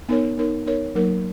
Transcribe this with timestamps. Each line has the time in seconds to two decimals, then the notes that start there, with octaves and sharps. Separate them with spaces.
0.09 B3 D#4 A#4 C#5
0.37 B3 D#4 A#4 C#5
0.66 B3 D#4 A#4 C#5
0.95 F#3 A#3 D#4 A#4